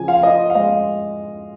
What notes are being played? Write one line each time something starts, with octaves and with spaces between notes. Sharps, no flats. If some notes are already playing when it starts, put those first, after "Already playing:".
Already playing: C#3 F3 G#5
F5
F4 D#5
F5
G#3 D#5